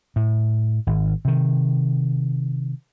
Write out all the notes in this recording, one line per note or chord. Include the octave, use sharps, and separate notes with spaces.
A2
G#1
C3 D#3